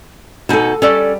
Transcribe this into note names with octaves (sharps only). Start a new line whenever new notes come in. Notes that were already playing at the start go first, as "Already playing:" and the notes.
B2 D#4 F#4 A4 G#5
G3 C#4 A4 D5